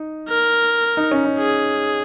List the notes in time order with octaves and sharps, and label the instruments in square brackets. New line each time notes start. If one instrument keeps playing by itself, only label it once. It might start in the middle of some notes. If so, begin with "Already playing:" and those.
Already playing: [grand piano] D#4
[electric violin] A#4
[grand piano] D#4
C#4
D#4
[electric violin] G#4